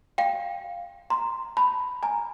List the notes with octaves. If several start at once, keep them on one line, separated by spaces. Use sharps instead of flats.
F5 G5
A#5 C6
A5 B5
G#5 A#5